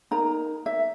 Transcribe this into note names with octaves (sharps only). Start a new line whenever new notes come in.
D#4 A#4 A#5
E5